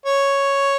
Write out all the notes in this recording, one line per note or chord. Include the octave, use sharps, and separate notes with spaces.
C#5